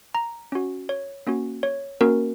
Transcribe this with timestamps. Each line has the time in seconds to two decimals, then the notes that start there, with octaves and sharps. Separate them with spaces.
0.15 A#5
0.52 C#4 F#4
0.89 C#5
1.27 A#3 C#4 F#4
1.63 C#5
2.01 A#3 C#4 F#4 A#4